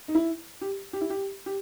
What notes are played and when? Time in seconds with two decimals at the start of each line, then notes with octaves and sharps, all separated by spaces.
0.08 D#4
0.15 E4
0.61 G4
0.93 G4
1.01 E4
1.10 G4
1.46 G4